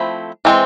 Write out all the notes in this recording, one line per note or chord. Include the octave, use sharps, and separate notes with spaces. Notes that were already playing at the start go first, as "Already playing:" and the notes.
Already playing: F3 A3 C4 E4
E3 G#3 C4